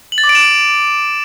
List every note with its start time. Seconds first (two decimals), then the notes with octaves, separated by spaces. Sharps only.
0.12 F#7
0.18 A6
0.24 D6
0.29 D7
0.35 E7